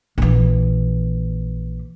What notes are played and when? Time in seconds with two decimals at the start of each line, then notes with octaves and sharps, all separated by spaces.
0.18 A#1 E3